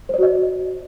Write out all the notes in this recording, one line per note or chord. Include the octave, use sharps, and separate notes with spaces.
F#4 C5 D5 D#5